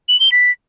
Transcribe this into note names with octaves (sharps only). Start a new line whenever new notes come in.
F#7
G7
B6